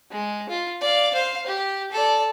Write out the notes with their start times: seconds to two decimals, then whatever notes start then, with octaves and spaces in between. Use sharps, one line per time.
0.11 G#3
0.49 F4
0.81 D5 F5
1.14 C5 F5
1.46 G4
1.92 A4 D5